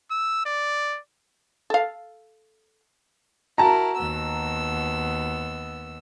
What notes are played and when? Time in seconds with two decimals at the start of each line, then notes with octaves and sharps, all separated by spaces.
0.11 E6
0.46 D5
1.70 A4 F5
3.58 E4 F#4 A#4 A5 A#5
3.98 D#2 B3 E6